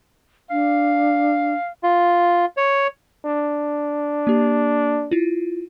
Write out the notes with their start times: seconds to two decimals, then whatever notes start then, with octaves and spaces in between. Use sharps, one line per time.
0.50 D4 F5
1.83 F4
2.57 C#5
3.25 D4
4.27 A#3 G4
5.11 E4 F4